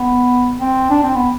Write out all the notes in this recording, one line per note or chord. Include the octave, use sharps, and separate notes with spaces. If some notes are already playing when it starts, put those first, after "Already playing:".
Already playing: B3
C4
D4
C4
B3